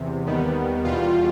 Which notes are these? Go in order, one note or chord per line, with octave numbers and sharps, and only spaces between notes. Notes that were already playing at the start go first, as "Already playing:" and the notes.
Already playing: E2 C3
D#2 D#3 G3 B3
E2 B2 G3 F4